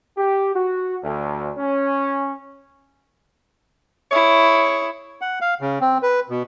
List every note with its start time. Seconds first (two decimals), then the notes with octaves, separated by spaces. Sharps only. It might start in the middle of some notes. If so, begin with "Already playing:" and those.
0.17 G4
0.55 F#4
1.03 D2
1.58 C#4
4.12 E4 G#4 C#5
5.21 F#5
5.41 F5
5.61 C#3
5.81 C4
6.02 B4
6.29 B2